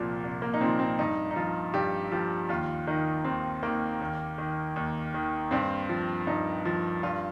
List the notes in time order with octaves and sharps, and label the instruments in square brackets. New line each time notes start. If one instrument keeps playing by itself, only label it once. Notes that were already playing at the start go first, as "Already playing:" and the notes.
Already playing: [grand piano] C2 A#2 F3 A#3
C2
A#3
D#4
A#2 F3 C4
C4
G2 D#4
D#4
F3 F4
G2 G4
F3 G4
D#2 F4
D#3 D#4
D#2 C4
D#3 A#3
D#2
D#3
D#2
D#3
G2 C4
F3
G2 D#4
F3
G2 F4